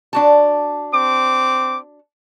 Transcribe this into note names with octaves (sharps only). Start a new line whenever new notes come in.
D4 F#4 A5
C4 D6